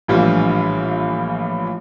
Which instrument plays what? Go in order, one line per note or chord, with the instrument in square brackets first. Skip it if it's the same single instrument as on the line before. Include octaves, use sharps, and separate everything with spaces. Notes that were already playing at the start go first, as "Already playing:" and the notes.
[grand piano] A#1 A2 E3 G3 D4 F4